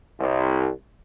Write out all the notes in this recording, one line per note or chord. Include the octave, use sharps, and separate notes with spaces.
C2